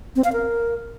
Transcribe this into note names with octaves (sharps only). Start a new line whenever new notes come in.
C4
F5
A#4